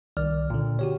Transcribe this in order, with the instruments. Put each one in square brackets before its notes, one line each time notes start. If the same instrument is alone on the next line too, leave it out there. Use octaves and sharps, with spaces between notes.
[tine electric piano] C2 D#3 D5 F6
A#2 D3
F#4 G4 C#5